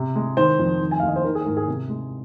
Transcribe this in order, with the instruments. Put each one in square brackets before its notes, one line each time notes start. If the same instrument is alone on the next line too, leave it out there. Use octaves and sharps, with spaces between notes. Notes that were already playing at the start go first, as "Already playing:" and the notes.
Already playing: [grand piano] C3
G#3
D#3 C5
F2
D#3
G#5
D#2 F5
D#5
C5
D#3 A#4
G#4
G#2 A#4
G#4
C3
G#3